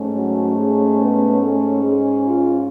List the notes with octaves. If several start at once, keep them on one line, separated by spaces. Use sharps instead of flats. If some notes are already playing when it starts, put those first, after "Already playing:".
Already playing: G#2 A3 C#4
F#3 F#4
G#3 G#4
B3 B4
A3 A4
G#3 G#4
F4